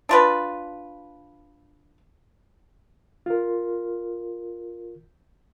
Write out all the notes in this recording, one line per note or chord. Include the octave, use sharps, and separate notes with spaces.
D4 F4 B4
F4 A#4